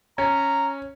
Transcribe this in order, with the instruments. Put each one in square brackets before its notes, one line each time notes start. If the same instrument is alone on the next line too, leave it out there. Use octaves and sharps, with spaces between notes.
[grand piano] C#4 [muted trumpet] A#5